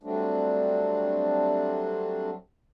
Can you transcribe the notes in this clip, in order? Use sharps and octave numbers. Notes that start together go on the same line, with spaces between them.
F#3 G3 A3 C4 D4